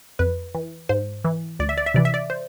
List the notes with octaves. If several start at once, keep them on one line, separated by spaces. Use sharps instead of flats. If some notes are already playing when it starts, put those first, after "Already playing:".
F2 B4
E3
G#2 C5
E3
D2 D5
E5
D5
E5
C3 E3 D5
E5
D5
C5